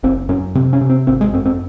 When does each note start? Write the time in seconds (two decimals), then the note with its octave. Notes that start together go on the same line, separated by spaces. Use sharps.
0.03 F#1 C4
0.29 F#2 C#4
0.55 C3 C4
0.73 C#4
0.81 C3
0.90 C4
1.07 G#1 C4
1.21 G#3
1.33 F#2 C4
1.46 C4